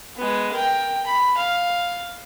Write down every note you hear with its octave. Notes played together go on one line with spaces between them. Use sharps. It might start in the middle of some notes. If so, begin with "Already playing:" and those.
G#3 B3
A#4 G5
B5
F5